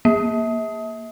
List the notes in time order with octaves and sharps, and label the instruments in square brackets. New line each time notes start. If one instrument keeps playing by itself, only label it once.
[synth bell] A#3